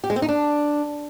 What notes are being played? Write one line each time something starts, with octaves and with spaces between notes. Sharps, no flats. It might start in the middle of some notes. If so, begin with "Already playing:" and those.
G4
G#3
C4
D#4
D4